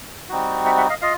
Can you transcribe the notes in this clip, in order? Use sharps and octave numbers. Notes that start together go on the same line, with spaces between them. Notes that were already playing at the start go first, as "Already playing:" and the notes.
G3 C4 D#4 F#4
E5 F#5
E5 F#5
D#5 F5
F4 D#5 F5